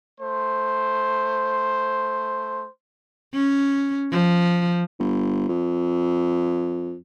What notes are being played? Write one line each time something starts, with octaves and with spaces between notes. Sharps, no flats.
A3 C5
C#4
F3
G1
F2